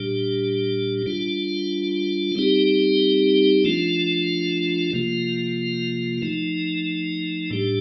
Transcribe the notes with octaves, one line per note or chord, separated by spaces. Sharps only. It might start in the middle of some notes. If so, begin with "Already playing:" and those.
Already playing: A#2 G3 D4 G4
G3 D4 F4
G3 C4 D#4 G4
F3 A3 D4 F4
C3 F3 A#3 F4
F3 A3 D#4
A2 G3 D4 G4